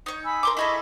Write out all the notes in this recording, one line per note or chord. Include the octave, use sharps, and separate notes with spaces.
D#4 C#5
G#5 B5 E6
A#4 C6 D6
E4 G#4 A4 D#5 B5 C#6